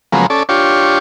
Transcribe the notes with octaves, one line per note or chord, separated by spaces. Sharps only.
C#3 F3 F#3 G#3 A#3 B3
C#4 A4 D5
D4 F4 G4 C#5